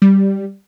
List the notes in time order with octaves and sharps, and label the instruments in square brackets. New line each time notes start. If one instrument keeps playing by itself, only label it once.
[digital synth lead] G3